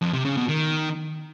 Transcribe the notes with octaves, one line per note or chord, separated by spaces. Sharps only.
F2
C3
C#3
B2
D#3